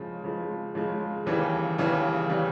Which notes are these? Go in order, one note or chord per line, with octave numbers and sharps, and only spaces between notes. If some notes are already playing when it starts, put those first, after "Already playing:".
Already playing: C#3 F3 G#3
C#3 F3 G#3
C#3 F3 G#3
D#2 C#3 E3 G3
D#2 C#3 E3 G3
C#3 E3 G3